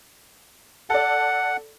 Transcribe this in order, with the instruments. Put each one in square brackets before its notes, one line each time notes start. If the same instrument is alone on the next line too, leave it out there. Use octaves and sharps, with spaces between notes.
[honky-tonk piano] A4 D5 [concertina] F#5